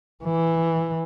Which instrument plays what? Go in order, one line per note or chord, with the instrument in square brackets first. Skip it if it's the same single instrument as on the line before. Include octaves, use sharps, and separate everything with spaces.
[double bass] E3